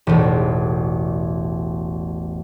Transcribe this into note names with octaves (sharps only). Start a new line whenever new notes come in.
E1 A1